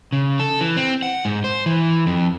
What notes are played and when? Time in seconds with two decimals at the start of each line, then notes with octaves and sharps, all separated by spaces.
0.12 C#3
0.39 A4
0.61 E3
0.77 C4
1.03 F#5
1.25 G#2
1.44 C5
1.66 E3
2.06 F2